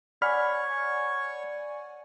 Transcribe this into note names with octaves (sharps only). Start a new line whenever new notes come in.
C#5 D5 F#5 G#5 B5 C#6 F6